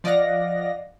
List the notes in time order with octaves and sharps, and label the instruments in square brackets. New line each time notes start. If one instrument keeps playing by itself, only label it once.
[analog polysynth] F3 D5 D#5 F5 F#5 A#6